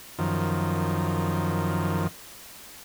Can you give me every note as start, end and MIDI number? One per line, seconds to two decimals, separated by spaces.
0.19 2.07 42
0.19 2.07 51
0.19 2.07 53